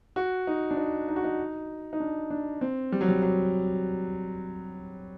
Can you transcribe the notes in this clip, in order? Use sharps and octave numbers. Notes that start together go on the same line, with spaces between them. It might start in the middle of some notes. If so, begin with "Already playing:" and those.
F#4
D#4
D4
D#4
D#4
F#4
D#4
D#4
D4
D4
C4
G3
F#3
G3
F#3